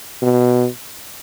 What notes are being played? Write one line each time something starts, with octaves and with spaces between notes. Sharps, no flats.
B2